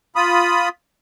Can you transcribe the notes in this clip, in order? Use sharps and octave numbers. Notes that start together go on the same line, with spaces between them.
F4 B5 D#6